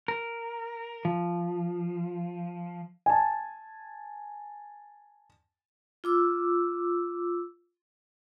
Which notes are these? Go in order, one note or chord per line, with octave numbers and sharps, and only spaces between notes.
A#4
F3
G#5 A5
F4 D6 E6